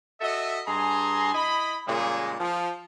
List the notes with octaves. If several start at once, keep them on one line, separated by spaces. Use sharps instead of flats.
F#4 A4 D#5 E5
G2 G#4 G#5 A#5 C6
E4 D#5 B5
A#2 C#3 G3 G#3
F3